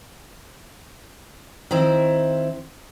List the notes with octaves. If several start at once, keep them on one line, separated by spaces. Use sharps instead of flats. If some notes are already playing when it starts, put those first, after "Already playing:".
D#3 C4 E4 C5